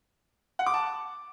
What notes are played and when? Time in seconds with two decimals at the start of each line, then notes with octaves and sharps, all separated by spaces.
0.59 F#5
0.66 D6
0.74 A5